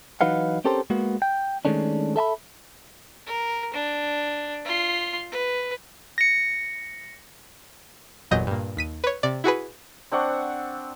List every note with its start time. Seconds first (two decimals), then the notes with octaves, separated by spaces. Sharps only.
0.21 E3 F#3 D#4 B4 F5 F#5
0.65 C4 C#4 G4 A4 A#4 C5
0.90 G#3 A#3 B3 F#4
1.22 G5
1.65 D#3 E3 G#3 A3 C#4 D4
2.16 A4 E5 A5 B5
3.27 A#4
3.73 D4
4.65 F4 C6
5.32 B4
6.18 A#6 C#7
8.31 G1 E2 A#2 F#3 D#5 G6
8.47 G2 A#2
8.77 D#2 B6 D#7
9.04 B4 C#5
9.23 C3 D5
9.44 E4 F#4 G#4 B4
10.12 C4 D4 F#5 C#6